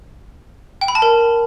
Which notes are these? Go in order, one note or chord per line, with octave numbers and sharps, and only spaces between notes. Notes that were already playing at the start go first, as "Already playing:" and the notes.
G5
B5
A5
A#4